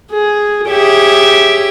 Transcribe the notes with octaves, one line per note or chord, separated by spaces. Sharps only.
G#4
G4 G#4 C#5 E5